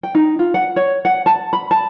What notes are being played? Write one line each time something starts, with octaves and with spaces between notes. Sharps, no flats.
G5
D#4
F4
F#5
C#5
F#5
A5
B5
A5